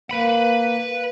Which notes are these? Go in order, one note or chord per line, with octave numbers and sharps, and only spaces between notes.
A#3 B4 B5